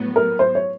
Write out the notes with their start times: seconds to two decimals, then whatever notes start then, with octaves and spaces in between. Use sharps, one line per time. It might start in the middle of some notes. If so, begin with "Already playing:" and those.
Already playing: A2 F#3 B3
0.16 A#4
0.39 C5
0.55 C#5